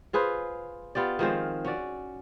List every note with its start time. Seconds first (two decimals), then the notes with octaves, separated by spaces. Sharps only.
0.13 F4 G#4 B4 C5
0.95 B3 F4 G4 D5
1.19 D#3 F3 G#3 C4
1.65 C#4 F#4 D5